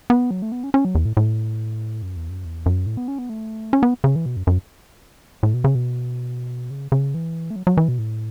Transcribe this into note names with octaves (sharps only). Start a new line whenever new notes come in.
B3
F#3
A3
B3
C#4
C#4
F#3
E2
A2
A2
F#2
E2
F#2
E2
F#2
A2
B3
C#4
B3
A3
C#4
B3
C#3
E3
B2
F#2
F#2
A2
B2
C#3
B2
C#3
C#3
E3
A3
F#3
F#3
E3
B2
A2